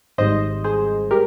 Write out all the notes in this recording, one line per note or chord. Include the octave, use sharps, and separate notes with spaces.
G#1 G#2 G3 C5 D#5
G#4 C5
G#3 G4 A#4